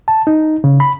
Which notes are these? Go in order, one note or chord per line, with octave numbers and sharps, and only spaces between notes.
A5
D#4
C#3
B5